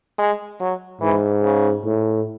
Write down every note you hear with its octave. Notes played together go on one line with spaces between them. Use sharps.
G#3
F#3
G#2 E3
C#3
A2